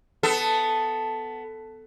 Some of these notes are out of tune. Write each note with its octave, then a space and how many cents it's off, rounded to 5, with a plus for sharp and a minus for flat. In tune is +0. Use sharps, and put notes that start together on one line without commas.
B3 +15 A4 +0